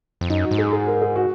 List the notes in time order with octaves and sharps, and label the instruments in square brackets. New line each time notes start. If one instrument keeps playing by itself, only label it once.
[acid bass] F2
[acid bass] F#2 [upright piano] D#4
[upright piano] F#4
[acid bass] G#2
[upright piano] G#4
G#4
A#4
G#4
F#4